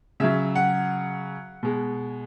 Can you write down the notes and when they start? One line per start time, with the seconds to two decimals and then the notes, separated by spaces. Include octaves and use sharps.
0.20 C#3 F#3 E5
0.55 F#5
1.63 B2 G#3